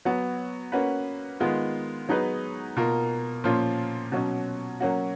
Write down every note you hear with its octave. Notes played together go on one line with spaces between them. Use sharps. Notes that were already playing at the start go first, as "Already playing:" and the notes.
F#3 B3 F#4
A#3 C#4 F#4 B4
D#3 G#3 B3 F4
F#3 B3 D#4 G#4 B4
B2 A#3 F4 A#4
A#2 F3 A#3 C#4 F4
B2 F#3 C#4
F#3 A#3 C#4 F#4